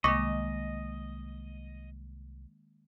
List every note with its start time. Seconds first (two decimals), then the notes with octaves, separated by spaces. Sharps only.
0.04 C2 D#3 G#3 A#3 D#5 C#6 D6 A#6